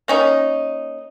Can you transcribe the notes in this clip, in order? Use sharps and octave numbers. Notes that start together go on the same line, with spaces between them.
A#3 C#4 D#4